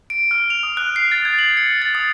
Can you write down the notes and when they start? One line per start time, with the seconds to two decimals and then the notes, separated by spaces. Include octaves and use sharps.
0.10 D7
0.31 F6
0.50 F7
0.63 D#6
0.77 F#6
0.96 C7
1.11 A6
1.25 G#6
1.39 F#7
1.57 C#7
1.82 A6
1.95 D#6